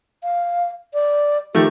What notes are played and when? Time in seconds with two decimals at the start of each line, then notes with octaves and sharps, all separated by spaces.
0.23 F5
0.94 D5
1.55 D#3 F3 A3 G4